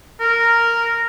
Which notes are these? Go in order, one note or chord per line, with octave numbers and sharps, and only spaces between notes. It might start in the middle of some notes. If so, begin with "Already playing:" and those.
A#4